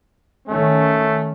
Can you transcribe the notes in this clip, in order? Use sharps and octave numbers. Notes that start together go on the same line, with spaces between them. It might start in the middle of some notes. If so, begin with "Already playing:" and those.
D#3 A3 C#4